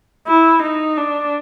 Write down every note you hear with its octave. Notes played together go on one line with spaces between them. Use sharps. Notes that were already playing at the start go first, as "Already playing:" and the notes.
E4
D#4
D4